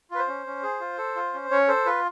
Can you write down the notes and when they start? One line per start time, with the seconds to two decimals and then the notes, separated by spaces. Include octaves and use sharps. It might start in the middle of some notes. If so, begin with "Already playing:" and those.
0.11 F4 B4
0.19 C5
0.28 C#4
0.46 C#4
0.63 G#4
0.80 F4
0.98 A4
1.16 F4
1.34 C#4
1.50 C#4 C#5
1.68 A4 C5
1.86 F4 B4